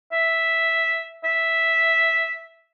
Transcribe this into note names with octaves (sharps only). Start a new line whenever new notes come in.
E5
E5